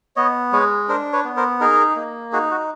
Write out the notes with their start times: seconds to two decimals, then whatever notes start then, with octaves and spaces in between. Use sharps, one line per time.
0.16 B3 C#5 D#5
0.53 G#3 B4 C#5
0.89 D4 A#4 C5
1.13 B4 C#5
1.25 B3
1.37 A#4 C5
1.60 D#4 G#4 A#4
1.96 A#3
2.33 D#4 F#4 G#4
2.51 F#4